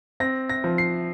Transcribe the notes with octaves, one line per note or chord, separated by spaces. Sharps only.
C4 A#6
A#6
F3
C7